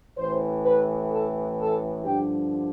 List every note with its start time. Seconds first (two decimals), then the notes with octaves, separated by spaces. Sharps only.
0.17 A1 A2 E3 C5
0.64 B4
1.11 A4
1.58 A4
2.04 G2 D3 F3 G4